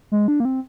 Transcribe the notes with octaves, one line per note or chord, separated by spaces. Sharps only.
G#3
D4
A#3
C4